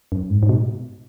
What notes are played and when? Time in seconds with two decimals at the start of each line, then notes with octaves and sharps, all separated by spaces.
0.12 F#2
0.30 G#2
0.43 G#2
0.49 B2